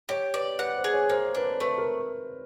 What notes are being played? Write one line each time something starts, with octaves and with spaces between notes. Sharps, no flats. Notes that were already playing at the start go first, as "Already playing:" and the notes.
G4 C#5
B4 D5
B4 F#5
C5
G#4
C#5
A#3 C5
C#5
D4 B4
C5
A3 B4
A#4